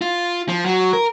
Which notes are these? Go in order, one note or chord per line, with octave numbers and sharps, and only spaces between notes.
F4
F3
F#3
A#4